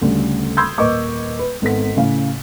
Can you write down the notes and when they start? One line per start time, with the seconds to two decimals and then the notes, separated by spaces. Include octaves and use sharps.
0.01 D2 C#3 G3
0.57 B5 C6 D#6 E6 G6 G#6
0.78 D#1 A#3 B4 D#5 C#6 D6
1.39 B4
1.62 G#1 B3 A4 B6
1.96 A2 C#3 F5